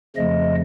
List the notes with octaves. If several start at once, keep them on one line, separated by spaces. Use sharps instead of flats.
F2 C#3 F3 A3 D#5